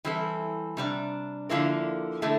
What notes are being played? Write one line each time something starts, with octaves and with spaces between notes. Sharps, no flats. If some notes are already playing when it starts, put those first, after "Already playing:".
E3 G3 C4 E4 A4
C3 G3 D4
D3 F3 A#3 E4 A#4
D3 A3 E4 A4